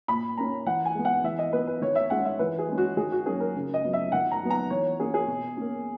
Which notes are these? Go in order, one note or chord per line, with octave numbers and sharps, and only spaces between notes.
A#2 B5
A#3 C#4 A#5
E3 F#5
G#5
G#3 B3
F#5
E3 E5
D#5
B3 B4
B4
D#3 C#5
E5
G#3 C#4 F#5
E5
E3 B4
G#4
G#3 C#4
F#4
D#3 G#4
F#4
F#3 A#3 C#4 G#4
A#4
C#3
D#5
F#3 B3
E5
D#3 F#5
A#5
F#3 B3
A#5
E3 C#5
A#3 C#4 G#4
G#4
B2
A#3 C#4